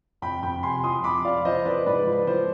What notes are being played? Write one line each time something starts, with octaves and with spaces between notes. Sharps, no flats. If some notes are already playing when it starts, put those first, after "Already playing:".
F2 G5 B5
F2 G5 B5
C3 G#5 C6
F3 C6 D#6
F2 B5 D6
F3 D5 F5
F3 C5 D#5
F3 B4 D5
G#2 B4 D5
F3
F3 C5